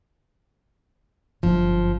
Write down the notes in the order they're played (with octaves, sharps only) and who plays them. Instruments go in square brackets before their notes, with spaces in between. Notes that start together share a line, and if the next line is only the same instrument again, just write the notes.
[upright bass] G1 F#2 [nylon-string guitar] F3